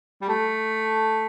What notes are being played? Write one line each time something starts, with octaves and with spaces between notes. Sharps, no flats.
G3
A3